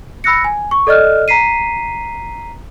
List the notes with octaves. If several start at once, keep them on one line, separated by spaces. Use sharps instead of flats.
B5 E6 F#6 A#6 C#7
G#5
C#6
A4 D5 D#5 F6 F#6
A#5 B6 C7 D#7